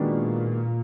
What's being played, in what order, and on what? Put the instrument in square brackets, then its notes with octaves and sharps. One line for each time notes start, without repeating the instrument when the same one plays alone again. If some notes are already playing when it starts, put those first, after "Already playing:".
Already playing: [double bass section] A#2 [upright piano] D#3 G#3 B3 D4 F#4